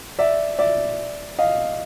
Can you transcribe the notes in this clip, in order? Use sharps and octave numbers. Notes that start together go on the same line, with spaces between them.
D5 E5
D5 E5
D#5 F5